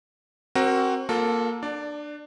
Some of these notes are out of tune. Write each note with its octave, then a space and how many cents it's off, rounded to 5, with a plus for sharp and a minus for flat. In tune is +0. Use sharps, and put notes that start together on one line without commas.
C4 +30 F#4 +20 A#4 +0
A#3 +0 F4 +45 A4 +0
D4 +25 D5 +0